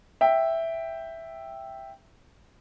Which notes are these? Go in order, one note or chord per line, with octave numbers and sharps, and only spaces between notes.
E5 G5